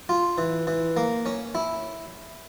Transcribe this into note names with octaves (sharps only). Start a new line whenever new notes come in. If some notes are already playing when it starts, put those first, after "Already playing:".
F4
E3
E3
A#3
C#4
E4